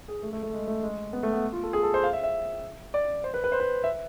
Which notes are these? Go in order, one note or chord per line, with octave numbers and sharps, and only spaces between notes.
G#4
A3
A3
A3
G#3
A3
G#3
B3
A3
B3
F4
A4
G#4
A4
C5
F5
E5
E5
D5
C5
B4
B4
C5
B4
E5